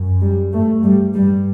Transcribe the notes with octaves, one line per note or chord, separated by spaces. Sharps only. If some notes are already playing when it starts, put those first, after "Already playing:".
Already playing: F#2
G3
G2 A3
G3
G2 G3